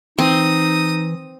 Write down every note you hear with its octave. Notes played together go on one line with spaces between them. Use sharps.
E3 C4 D#4 D#6